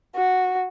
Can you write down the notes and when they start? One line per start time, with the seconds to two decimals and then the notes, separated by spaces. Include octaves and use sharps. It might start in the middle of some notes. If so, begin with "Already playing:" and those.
0.16 F#4